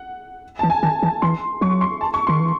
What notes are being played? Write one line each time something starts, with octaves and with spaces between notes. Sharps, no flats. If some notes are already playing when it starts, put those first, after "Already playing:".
Already playing: F#5
E3 A5
G#5
D#3 A5
E3 A5
E3 C6
F#3 C#6
C6
A5
C#6
D#3 C6
E3